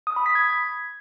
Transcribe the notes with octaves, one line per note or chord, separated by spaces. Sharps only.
D#6
B5
B6
G#6